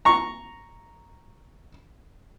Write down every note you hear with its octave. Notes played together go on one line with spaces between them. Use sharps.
A#5 C#6